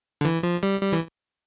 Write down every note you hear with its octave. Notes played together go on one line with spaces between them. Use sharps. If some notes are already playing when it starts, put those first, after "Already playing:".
D3
E3
F3
G3
G3
E3